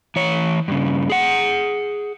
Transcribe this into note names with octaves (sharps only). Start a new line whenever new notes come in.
E3 C#5
G2 C#3
G#4 F#5